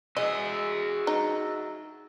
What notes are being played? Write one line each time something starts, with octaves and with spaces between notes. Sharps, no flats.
F#4 G#4 D#5 E5
D#4